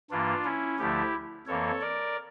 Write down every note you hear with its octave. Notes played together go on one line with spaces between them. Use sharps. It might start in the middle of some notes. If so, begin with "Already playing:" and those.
G2 E3 A#3 D4 F4
C#4 E4
D2 D3 F3 A3 E4 G4
F2 E3 A#3 A4 C#5
A#4 D5